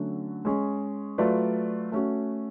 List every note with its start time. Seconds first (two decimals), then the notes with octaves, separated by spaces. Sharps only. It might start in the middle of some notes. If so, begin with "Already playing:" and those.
Already playing: D3 F#3 A3 C#4 F#4
0.45 G#3 C#4 G#4
1.18 F#3 A3 F4 B4 D5
1.92 A3 C#4 F#4